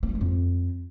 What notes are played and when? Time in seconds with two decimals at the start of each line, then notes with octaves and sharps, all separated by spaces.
0.03 A#3
0.09 A3
0.15 G#3
0.21 F2